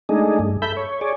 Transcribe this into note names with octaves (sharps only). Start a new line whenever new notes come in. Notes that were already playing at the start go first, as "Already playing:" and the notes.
G#3 A3 D4 D#4 G#4
G2
A4 E5 B5 G6
C#5
G#4 C#5 D5